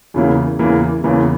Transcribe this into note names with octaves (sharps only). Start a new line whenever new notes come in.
E2 C#3 E3 A#3
E2 C#3 E3 A#3
E2 C#3 E3 A#3